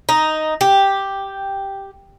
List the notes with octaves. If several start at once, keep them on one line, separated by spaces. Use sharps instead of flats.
D#4
G4